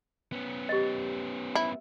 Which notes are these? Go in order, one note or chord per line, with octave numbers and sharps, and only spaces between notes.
B3 C#4
G4 D#5
E4